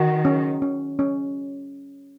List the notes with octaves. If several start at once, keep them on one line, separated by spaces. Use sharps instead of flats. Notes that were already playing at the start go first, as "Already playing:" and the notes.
Already playing: D#3 F#4
C#4
C#4
C#4